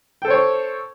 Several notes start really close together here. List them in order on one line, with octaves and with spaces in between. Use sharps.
G5 A4 C5 C#5